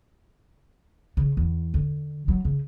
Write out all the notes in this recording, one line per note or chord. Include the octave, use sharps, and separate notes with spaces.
C#3
E2
D3
F#3
C#3